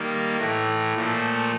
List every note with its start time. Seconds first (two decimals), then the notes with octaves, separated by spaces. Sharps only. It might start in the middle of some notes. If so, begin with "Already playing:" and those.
Already playing: D#3 G3 A#3
0.37 A2 E3 A3
0.94 A#2 F3 A3